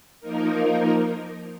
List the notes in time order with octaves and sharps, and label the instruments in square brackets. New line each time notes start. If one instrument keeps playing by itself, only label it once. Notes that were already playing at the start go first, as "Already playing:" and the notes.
[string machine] F3 A#3 D#4 A#4